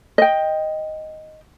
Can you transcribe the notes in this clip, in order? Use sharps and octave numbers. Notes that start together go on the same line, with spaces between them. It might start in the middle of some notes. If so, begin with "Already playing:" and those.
D#5 G5